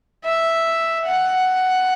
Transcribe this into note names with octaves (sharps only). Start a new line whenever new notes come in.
E5
F#5